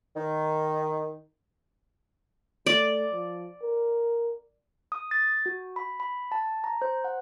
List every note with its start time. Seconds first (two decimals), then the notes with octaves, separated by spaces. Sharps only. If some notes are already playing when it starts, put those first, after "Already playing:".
0.16 D#3
2.66 A3 D5
3.12 F3
3.62 A#4
4.92 D#6
5.11 A6
5.46 F#4
5.76 B5
6.00 B5
6.32 A5
6.64 A#5
6.82 C5
7.04 F#5